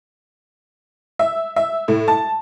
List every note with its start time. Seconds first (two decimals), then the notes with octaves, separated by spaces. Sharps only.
1.19 E5
1.56 E5
1.88 A2
2.08 A5